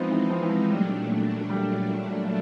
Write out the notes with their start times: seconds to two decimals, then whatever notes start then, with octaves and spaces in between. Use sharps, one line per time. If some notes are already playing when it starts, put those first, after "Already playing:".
Already playing: F3 G#3 B3 C4 D#4
0.10 E3
0.30 F3
0.41 E3
0.50 F3
0.70 A#2 F#3 G3 A3 D4
1.50 G3